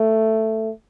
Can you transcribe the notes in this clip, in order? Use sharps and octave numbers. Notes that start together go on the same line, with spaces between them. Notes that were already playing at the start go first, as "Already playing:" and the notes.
Already playing: A3